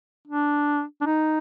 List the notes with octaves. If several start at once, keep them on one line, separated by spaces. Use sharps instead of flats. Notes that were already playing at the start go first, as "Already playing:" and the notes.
D4
D4
D#4